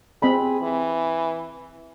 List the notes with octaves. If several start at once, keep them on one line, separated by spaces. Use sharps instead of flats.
C4 G#4 D#5 B5
E3